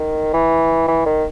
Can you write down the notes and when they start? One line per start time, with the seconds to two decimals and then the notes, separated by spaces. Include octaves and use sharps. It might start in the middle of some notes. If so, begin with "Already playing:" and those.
Already playing: D#3
0.33 E3
0.88 E3
1.05 D#3